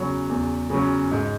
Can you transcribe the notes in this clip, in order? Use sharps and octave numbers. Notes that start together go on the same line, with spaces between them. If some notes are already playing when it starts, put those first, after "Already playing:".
Already playing: E2 C#3 F#3
E2
C#3 F#3
G#2